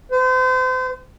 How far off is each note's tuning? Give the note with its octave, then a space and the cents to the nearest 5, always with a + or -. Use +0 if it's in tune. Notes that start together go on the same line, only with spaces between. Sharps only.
C5 -40